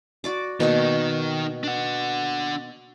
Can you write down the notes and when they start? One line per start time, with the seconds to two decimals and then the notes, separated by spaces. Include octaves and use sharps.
0.24 F#4 D5 D6
0.60 B2 D#3 A#3 D#4 C#6
1.63 D4 F#5